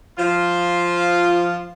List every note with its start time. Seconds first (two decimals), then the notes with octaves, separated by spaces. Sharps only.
0.18 F3 F4